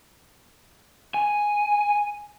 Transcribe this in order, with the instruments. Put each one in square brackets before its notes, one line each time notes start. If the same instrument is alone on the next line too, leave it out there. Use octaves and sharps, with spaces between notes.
[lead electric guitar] G#5